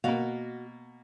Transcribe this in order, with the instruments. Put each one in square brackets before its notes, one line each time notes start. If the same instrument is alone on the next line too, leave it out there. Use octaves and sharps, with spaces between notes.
[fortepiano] B2 A#3 [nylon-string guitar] F#4 F5